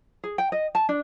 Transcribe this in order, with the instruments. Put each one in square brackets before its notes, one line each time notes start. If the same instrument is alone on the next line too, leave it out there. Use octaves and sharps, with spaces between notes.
[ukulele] G#4
G5
D#5
A5
D4